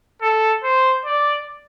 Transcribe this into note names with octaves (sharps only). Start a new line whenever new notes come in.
A4
C5
D5